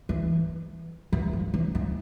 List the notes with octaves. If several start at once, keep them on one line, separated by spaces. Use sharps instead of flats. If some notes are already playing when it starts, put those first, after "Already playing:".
E3
E3
F3
E3
E3